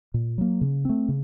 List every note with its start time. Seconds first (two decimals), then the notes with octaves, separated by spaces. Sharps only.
0.14 A#2
0.38 F#3 A#3
0.61 C#3
0.85 A3 C4
1.09 C#3